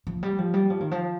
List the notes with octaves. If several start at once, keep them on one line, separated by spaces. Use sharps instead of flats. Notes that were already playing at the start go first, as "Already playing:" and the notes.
F3
G3
F3
G3
F3
D#3
F3